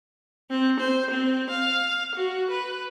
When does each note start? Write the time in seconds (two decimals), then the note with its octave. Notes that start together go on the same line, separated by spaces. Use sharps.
0.50 C4
0.80 C5
1.11 C4
1.50 F5
2.15 F#4
2.50 B4